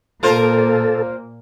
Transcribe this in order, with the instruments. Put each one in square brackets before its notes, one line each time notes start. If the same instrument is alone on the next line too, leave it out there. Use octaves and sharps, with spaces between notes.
[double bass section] A#2 A#3 [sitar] F4 A#4 C5 [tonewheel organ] A4